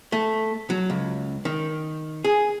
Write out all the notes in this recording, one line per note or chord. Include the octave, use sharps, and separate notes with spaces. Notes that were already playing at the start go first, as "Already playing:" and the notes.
A3
F#3
C#2
D#3
G#4